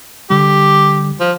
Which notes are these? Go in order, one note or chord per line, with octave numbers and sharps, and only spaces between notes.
D3 G3 G4
F3